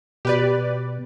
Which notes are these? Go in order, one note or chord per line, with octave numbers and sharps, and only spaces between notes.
B2 G4 B4 D5